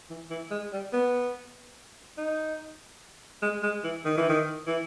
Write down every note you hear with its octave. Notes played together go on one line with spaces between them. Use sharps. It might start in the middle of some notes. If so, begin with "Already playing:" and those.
E3
E3
G#3
G3
B3
D#4
G#3
G#3
E3
D#3
E3
D#3
E3